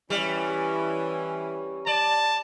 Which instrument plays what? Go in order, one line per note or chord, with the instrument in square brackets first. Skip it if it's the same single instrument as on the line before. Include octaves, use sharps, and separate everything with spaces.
[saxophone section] E3 [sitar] G3 [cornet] C#4
[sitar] D5 [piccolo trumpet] A5